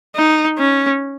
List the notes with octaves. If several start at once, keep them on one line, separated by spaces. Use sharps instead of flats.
D#4
C#4